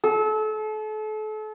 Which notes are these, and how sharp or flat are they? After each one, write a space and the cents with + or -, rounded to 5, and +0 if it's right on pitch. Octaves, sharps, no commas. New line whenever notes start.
A4 -35